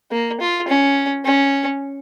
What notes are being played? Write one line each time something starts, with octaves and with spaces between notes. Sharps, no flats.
A#3
F4
C#4
C#4